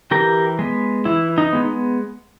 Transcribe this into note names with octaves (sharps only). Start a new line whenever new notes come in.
E3 G4 A#4
G#3 B3
E3 E4
D#4
G#3 B3